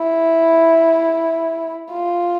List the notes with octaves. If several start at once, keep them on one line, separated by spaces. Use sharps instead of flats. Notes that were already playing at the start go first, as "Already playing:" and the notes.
Already playing: E4
F4